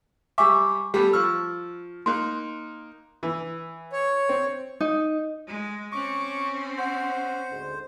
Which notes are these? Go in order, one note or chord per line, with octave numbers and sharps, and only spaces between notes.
G3 E5 G#5 C#6 D6
G3 A3 B3 G4
F3 C#6 E6 F6
A#3 D#4 C6 F#6
E3
C#5
C4
D#4
G#3
C4 C#4 C#6 D6
C5 F#5
D2 G#2 D3